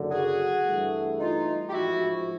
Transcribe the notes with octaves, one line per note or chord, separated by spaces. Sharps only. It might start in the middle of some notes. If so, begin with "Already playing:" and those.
Already playing: F#1 F#2 D3
F#4 G#4
G2 E3 A3
D#4 F4
G4
A1 G#2 F3 E4 F#4